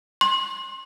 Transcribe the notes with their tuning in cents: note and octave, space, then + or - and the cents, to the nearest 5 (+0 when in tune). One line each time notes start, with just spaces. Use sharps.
C6 +30